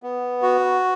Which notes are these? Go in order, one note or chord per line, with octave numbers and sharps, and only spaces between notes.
B3
F#4